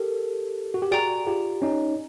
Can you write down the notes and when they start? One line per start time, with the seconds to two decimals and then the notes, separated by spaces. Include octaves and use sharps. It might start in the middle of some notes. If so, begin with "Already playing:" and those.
Already playing: G4 A4 A#4
0.74 F#4
0.82 G4
0.91 F#4 G#4 D5 G5 A#5
1.27 F4 G4
1.62 C#4 D#4